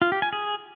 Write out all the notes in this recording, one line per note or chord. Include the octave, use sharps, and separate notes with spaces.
F4
G4
G#5
G#4